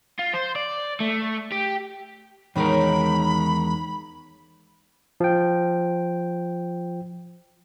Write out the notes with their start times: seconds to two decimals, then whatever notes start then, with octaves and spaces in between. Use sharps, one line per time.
0.19 F4
0.33 C5
0.55 D5
1.00 A3
1.52 G4
2.56 E2 D#3 G#3 D#4 A#4 C#5 B5
5.20 F3 G5